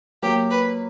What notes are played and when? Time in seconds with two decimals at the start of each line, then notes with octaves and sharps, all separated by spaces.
0.23 F#3 A#3 G4
0.51 B4